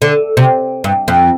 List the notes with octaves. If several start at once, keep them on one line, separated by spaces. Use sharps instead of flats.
D3
C3
G2
F2